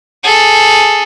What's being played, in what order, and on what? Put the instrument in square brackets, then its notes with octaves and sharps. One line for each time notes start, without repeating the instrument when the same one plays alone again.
[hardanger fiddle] G#4 A4